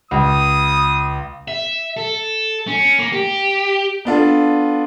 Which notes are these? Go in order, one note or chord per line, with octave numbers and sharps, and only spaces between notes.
C#2 D#6
E5
A4
C#4
A#3
G4
B3 D4 F4 A4